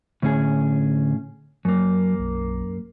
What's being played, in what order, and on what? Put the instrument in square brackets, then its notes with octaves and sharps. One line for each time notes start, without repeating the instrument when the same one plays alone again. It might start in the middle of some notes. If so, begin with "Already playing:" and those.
[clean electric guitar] A2 C#4 G#4 [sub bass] D3
[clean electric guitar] F#2 A#3 [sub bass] F#3
[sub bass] B1